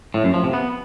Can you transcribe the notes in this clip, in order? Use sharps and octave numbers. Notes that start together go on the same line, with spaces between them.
A2
F#2
F3
C3
B3